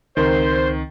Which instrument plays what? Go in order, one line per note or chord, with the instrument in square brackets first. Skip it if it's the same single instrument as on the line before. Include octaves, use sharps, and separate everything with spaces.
[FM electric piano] C#2 C4 A#4 [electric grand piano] D#3 [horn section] C5